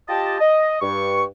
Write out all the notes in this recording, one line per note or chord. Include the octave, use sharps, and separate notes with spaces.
F4 G4 D#5 A5
D#5
G2 C#6